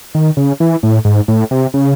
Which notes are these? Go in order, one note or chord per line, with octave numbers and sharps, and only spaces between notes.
D#3
C#3
E3
A2
G#2
A2
C3
C#3